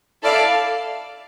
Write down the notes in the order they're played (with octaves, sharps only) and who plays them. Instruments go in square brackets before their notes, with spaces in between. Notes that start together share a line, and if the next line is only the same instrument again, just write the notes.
[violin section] E4 A4 D5 F5 A5